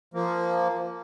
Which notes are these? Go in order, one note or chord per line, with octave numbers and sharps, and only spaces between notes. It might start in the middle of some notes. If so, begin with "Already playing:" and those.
F3 A#3